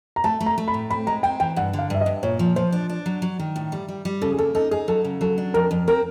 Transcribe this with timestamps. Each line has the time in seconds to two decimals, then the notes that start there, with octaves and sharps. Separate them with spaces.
0.16 A#5
0.24 A3 A5
0.40 A3
0.46 A#5
0.58 A3
0.68 B5
0.74 A2
0.90 C4 B5
1.07 G#3 A#5
1.23 C4 G5
1.40 E3 G5
1.56 G2 F#5
1.73 D3
1.79 F5
1.90 G2 E5
2.01 D#5
2.06 G2
2.23 A#2 C#5
2.39 F3
2.56 F3 C5
2.72 D4
2.89 D4
3.06 F#3
3.22 F#3
3.39 D#3
3.56 A2
3.72 G3
3.88 G3
4.05 G3
4.22 C#3 A4
4.32 G#4
4.38 A#3 A4
4.55 D#4 A4
4.71 D#4 G#4
4.88 F#3 A4
5.05 C#3
5.21 F#3 A4
5.38 D4
5.54 F2 A#4
5.71 F2
5.88 C4 A#4